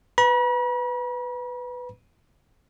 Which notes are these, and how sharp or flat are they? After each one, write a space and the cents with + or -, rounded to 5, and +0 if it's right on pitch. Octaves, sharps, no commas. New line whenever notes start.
B4 +10 B5 -45